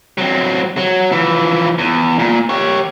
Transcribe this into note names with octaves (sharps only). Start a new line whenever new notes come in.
F#3 C4
F#3
E3 F3
E2
A#2
G4 C#5